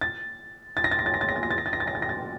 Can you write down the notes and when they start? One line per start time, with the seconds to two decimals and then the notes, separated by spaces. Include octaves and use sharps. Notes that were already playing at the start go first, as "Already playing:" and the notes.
0.01 A6
0.77 A6
0.84 A#6
0.91 A6
0.99 A#6
1.06 A6
1.14 A#6
1.21 A6
1.29 A#6
1.36 A6
1.43 A#6
1.51 A6
1.58 A#6
1.66 A6
1.73 A#6
1.80 A6
1.87 A#6
1.95 A6
2.02 A#6
2.09 A6